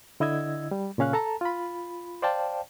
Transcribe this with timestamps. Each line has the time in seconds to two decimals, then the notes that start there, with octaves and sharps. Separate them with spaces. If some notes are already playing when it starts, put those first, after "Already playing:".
0.20 D3 E4 D#5 E6 G#6
0.71 G3
0.98 A#2 C#3 C#4 F5 F#6
1.13 A4 A5 A#5
1.41 F4 B5
2.22 C5 D5 F5 G5 A5